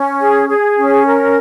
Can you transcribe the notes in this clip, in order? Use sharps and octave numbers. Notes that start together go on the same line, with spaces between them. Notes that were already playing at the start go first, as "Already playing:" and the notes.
Already playing: C#4
G#4
G#4
C#4
A#4